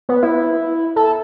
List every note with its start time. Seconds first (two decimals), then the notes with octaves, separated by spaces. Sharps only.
0.09 B3
0.23 E4
0.96 A4